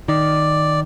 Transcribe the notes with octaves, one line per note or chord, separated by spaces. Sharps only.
D#3 D5